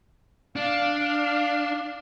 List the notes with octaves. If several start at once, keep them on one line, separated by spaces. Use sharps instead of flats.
D4 F5